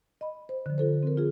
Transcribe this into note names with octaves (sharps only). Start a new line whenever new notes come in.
D#5 B5
C5
D3 F3
F4 A4 C5
C4 A#4
F4 G#4